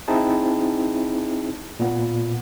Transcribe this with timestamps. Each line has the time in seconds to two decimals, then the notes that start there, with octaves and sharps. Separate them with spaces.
0.08 C4 D#4 E4 G#4 A5
1.80 A#2 B3